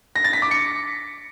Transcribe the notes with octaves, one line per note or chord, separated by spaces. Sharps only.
A#6
A6
B6
D6
C#7